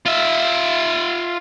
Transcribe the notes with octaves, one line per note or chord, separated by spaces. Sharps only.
F4 E5